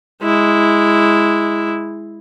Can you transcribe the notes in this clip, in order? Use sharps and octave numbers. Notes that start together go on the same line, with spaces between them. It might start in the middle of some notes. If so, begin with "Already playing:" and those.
G#3 E4